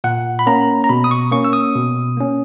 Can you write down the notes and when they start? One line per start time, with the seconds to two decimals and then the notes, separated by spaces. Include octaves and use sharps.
0.04 A#2 F#5
0.39 B5
0.47 A#3 C#4 A#5
0.84 A#5
0.89 B2 B5
1.04 D#6
1.11 C#6
1.32 A#3 C#4 C#6
1.44 E6
1.53 D#6
1.75 B2
2.17 A#3 C#4